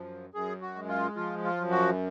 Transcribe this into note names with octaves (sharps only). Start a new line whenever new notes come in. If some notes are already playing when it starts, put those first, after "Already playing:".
Already playing: F#2 F3
F#2 G#4
F#4
G#3
F4
F3 F4
F4
F#2
F#4